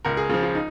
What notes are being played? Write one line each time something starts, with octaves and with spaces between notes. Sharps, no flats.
C#2 A#4
G#4
C#3 F3 F4
F4
D#4